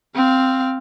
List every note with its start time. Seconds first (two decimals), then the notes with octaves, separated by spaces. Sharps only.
0.15 C4 F5